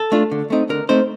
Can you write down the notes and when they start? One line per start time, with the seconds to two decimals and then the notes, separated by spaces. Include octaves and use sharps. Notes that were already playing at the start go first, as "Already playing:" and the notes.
Already playing: A4
0.12 A3 D4 F4
0.31 D3
0.50 A3 C4 D#4
0.69 D3 A#4
0.89 A3 C4 D#4 C5